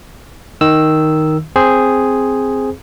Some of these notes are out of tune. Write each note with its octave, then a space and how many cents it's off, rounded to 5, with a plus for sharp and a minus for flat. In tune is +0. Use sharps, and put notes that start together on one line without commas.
D#3 +0 E6 +0
C4 +0 G#4 +0 C5 +0